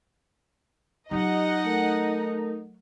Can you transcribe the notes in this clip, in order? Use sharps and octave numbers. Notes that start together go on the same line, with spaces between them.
F#3 D#4 F4 G4 D#5 F#5
A3 A4 A#4